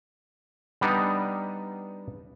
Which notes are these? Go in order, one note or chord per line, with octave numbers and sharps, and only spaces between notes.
G3 B3 D4 D#4